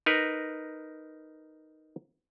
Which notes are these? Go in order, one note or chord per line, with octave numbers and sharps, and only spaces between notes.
D#4 A#4 B4